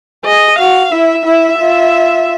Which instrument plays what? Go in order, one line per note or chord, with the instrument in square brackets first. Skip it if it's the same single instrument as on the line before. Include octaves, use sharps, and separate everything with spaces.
[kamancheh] G#4 [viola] D#5
[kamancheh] F#4 [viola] F5
[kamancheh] E4 [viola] E5
[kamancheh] E4 [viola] E5
[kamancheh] F4